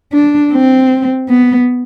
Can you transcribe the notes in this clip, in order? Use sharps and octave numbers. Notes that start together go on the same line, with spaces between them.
D4
C4
B3